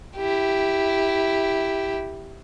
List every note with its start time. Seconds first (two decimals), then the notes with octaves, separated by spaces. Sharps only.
0.17 E4 G4